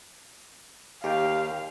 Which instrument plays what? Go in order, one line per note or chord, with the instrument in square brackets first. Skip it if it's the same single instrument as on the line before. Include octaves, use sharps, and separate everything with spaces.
[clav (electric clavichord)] D#2 [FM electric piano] G4 G5 [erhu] F5